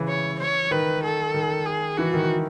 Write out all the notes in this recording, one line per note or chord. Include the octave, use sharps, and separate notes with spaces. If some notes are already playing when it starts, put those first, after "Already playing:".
Already playing: C#3 E3
C#5
C#5
D#3 B4
A4
D#3
G#4
E3 F#4
D#3